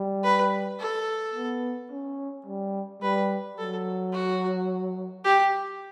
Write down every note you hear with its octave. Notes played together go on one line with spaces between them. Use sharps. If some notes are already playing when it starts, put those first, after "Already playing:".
Already playing: G3
B4
A4
B3
C#4
G3
G3 B4
F#3 A4
F#4
G4